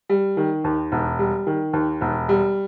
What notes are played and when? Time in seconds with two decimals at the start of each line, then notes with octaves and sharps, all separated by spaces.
0.09 G3
0.37 D#3
0.64 D#2
0.92 E1
1.19 G3
1.47 D#3
1.73 D#2
2.01 E1
2.29 G3